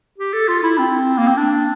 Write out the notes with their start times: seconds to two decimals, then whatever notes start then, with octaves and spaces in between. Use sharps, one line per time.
0.18 G4
0.34 A4
0.48 F4
0.63 E4
0.78 C4
1.18 A#3
1.27 C4
1.37 D4